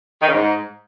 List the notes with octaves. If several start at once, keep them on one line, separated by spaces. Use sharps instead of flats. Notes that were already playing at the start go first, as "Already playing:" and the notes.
D#3
C#3
G#2